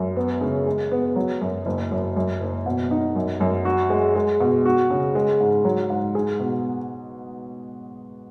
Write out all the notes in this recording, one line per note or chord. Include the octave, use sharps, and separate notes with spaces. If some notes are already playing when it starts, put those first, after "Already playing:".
Already playing: F#2
B3
C#3
G#3
B3
F#3
F#2
F#1
F#2
F#2
F#1
B2
D#4
F#2
F#2
F#4
G#3
G#3
B2
F#4
C#3
G#3
G#2
F#3
G#2
G#4
B2